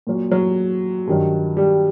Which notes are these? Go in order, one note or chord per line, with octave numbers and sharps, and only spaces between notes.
A#2 F#3
F#3
G2 D#3 F#3
G3